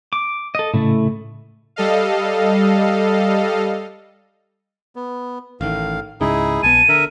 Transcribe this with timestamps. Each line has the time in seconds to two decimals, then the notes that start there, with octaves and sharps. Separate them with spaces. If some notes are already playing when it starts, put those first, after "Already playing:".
0.13 D6
0.55 A4 D#5
0.74 A2 C#3 A3 E4
1.76 G3 A4 D#5 F5
4.96 B3
5.61 A1 A2 D#3 F5
6.21 C#2 G#2 C#3 D#4 E4 G#4
6.63 A#1 B3 G#5 A5 D#7
6.89 D3 A#4 E5